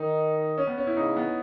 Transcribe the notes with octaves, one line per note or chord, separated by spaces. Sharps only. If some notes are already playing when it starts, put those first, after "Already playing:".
Already playing: D#3 D#4
C#4
B3
C#4
E4
C#3 D#4
B3